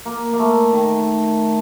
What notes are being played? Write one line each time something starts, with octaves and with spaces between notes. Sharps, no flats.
A#3
A#3
A3
D#3